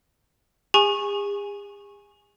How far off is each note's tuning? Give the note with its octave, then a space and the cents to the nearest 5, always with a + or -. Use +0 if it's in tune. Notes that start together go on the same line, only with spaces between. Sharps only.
G#4 -45 G#5 +0 C#6 -20